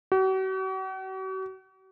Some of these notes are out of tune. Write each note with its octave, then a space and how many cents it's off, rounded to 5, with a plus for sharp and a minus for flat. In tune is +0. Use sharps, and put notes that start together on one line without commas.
F#4 +45